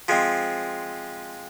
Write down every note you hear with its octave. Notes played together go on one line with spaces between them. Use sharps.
F3 G#3 C4